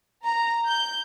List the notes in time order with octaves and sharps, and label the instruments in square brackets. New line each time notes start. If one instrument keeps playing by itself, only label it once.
[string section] A#5
G6